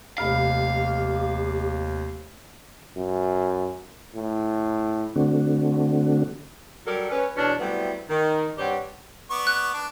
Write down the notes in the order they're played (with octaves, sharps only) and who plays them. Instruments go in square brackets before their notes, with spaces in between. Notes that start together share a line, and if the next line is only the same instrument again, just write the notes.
[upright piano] F1 B5 F6 [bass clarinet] D#2 [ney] G4 [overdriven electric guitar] F5
[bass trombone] F#2
A2
[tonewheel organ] D3 A3 C4 D4 F#4
[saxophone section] F#3 G3 A4 A#4 D5
C#4 B4
E2 B2 C#4 D4
F#3 G3 A3 B3 C4 E4
D#3
G2 G3 C4 G4 C#5 F#5
[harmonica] B3 D5 C#6
[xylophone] F#6
[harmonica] D4